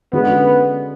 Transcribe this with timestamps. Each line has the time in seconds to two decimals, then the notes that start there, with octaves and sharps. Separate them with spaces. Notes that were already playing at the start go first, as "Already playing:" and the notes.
0.13 D3 G#3 B3 C#4 F#4 B4